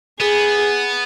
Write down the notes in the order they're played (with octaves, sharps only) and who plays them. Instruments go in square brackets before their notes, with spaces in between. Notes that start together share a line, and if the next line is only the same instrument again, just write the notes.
[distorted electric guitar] B3 [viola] G#4